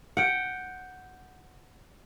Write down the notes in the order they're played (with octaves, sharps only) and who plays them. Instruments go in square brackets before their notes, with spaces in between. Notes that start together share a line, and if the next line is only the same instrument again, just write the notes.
[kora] F#5 G5